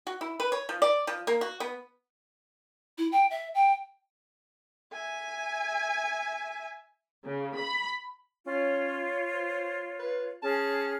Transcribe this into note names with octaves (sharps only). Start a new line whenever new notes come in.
F#4
E4
B4
C#5
F3
D5
F3
A#3
F#4
B3
E4
G5
E5
G5
E5 G#5
C#3
B5
C#4 F4 C#5
C5
B4
C#4 G#4 A5 F6